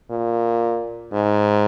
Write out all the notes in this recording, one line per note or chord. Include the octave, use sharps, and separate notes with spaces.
A#2
G#2